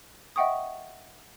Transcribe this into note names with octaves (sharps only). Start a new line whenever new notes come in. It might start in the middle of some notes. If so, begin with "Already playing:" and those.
D#5 E5 F#5 G5 C#6 D#6